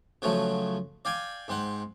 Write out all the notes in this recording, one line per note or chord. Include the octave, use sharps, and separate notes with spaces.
C#3 F3 F#3 A3
D5 F5 G5 G#5
G#2 C4 F#5